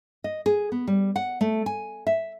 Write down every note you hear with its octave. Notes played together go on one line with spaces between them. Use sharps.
D#5
G#4
B3
G3
F#5
A3
G#5
E5